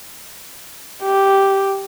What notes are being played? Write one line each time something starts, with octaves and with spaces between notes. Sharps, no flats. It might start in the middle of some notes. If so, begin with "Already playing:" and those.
G4